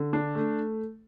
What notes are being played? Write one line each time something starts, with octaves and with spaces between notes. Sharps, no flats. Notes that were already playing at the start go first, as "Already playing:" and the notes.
Already playing: D3
D4
A3